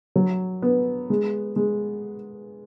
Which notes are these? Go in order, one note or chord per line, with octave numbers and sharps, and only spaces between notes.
F#3
B3
G#3
G#3